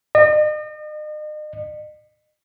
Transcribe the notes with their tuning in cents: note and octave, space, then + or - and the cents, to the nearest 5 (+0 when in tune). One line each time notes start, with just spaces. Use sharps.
D#5 -40